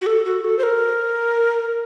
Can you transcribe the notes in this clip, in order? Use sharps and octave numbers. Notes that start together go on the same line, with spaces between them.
F#4
A4
F#4
A4
C5
A#4